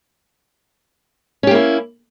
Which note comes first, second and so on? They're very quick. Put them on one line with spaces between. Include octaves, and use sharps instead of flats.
C#4 G4 A#3 E4